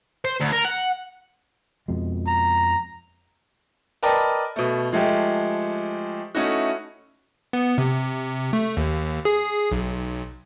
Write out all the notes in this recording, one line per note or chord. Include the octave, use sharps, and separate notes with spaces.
C5
D2
A#4
F#5
F2 B2 G#3
A#5
A#4 B4 D5 D#5 G5 A5
B2 A3
F3 G#3 A3 G4
A3 C#4 D#4 E4 F#4
B3
C3
A3
D#2
G#4
B1